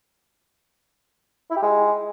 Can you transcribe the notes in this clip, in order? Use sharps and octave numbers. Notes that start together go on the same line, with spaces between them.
E4
G4
G#3